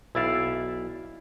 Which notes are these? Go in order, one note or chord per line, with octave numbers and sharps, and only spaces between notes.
B1 E4 D5 E5 F5